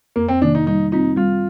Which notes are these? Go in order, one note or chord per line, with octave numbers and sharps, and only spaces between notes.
F2 A#3
C4
C3 D#3 A#3 D4
D#4
G3 D#4
C4 D#4 F4
G3 F4